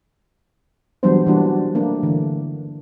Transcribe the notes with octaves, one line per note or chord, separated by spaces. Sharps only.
E3 F#3 G3 B3 D4 C5
E3 G3 A#3 D4 F#4
A3 A#3 D4
D3 E3 A3